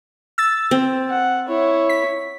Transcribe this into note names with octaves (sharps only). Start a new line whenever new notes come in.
E6 A6
C4
F#5
E4 C#5
B6